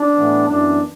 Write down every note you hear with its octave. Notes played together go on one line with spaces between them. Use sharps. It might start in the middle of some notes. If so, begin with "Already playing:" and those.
Already playing: D4
A2 E3 B3
F#2 E3 B3 D4